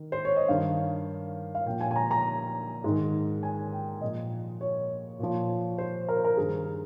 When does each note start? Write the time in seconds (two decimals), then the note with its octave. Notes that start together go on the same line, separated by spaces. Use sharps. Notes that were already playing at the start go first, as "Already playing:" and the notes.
Already playing: D#3
0.12 C5
0.25 C#5
0.36 D#5
0.48 G2 D#3 F5
1.55 F5
1.66 A#2 F3 G5
1.81 G#5
1.91 G#5
1.96 A#5
2.11 A#5
2.84 G#2 D#3
3.43 G#5
3.73 G5
4.01 A#2 F3 D#5
4.61 C#5
5.19 A#2 F3
5.78 C5
6.09 A#4
6.17 C5
6.24 A#4
6.37 G2 D#3 G#4